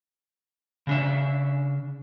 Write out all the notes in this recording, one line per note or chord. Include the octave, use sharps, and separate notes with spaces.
C#3 D4 E5